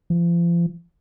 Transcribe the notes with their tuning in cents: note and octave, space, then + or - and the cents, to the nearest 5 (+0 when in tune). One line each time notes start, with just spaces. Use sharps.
F3 -35